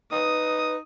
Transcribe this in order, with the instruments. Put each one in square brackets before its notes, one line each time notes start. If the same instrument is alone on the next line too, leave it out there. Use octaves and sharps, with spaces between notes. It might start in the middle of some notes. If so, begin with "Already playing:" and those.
[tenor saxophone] D#4 [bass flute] B4 [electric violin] D#6